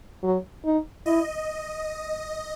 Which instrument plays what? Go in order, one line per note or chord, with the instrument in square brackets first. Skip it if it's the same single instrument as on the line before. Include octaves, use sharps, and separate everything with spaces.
[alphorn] F#3
D#4
[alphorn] E4 [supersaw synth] D#5